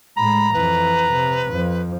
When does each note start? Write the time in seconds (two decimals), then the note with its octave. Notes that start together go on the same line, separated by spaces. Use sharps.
0.17 A2 G#3 A#5 B5
0.53 F2 E3 B4
1.12 C3
1.50 F2 F3